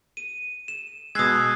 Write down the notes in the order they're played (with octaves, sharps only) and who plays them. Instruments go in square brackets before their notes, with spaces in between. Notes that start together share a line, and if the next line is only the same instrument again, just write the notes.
[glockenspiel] D#7
E7
[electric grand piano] B2 G#3 [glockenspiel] D#6 G#6 [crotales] E6 F#6 C7